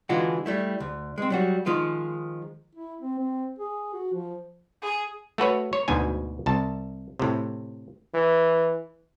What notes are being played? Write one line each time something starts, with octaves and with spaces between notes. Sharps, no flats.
D3 E3 G#3 F4 F#4
G3 A3 E4
D2
G#3 C4
F#3 G3 F#4
D#3 F3 G#3 F4
E4
C4
C4
G#4
F#4
F3
G#4
A3 F#4 B4 C#5
C#5
D2 G#2 B2 G#5
C2 A5
A2 C3
E3